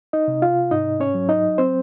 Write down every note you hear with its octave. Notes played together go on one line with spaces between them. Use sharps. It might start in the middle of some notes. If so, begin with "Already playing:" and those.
D#4 D#5
C3
F4 F5
G#2 D#4 D#5
C#4 C#5
F#3
D#4 D#5
C4 C5